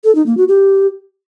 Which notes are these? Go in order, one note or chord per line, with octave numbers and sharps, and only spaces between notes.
A4
D#4
A#3
F#4
G4